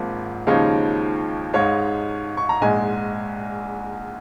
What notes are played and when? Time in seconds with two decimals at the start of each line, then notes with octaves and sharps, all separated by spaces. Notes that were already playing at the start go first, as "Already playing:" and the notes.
Already playing: G#1 G#2 F3 A#3
0.47 D#2 C#3 F3 G#3 D#4 C#5 F5
1.53 G#2 G#3 D#4 C#5 F5
2.37 C#6
2.49 A#5
2.61 A#1 G#2 G#3 D#5 G#5